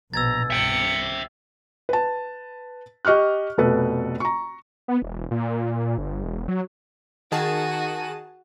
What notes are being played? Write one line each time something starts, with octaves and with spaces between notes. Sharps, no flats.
A#1 B2 A#5 E6 G#6 A6
G1 C2 E5 G5 C#7
B4 A5
G4 D#5 C#6 F6 F#6
F1 B2 A4 B4
A#5 C#6
B3
E1
A#2
G1
E1
F#3
D#3 F#4 G#4 A5 D#7